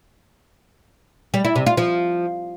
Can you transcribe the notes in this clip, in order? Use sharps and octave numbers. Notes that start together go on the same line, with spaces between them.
G3
E4
C3
F4
F3